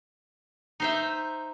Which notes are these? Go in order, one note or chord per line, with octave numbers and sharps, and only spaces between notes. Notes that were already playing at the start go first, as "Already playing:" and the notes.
D#4 C5 E5